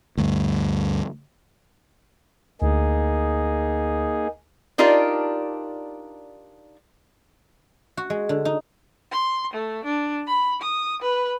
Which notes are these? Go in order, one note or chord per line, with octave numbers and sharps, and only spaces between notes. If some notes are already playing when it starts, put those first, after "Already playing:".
D2 G2
D2 A#3 D#4 G#4
D4 D#4 F4 G4 A#4 D5
F#4
G#3
D3
D#4
C6
A3
D4
B5
D#6
B4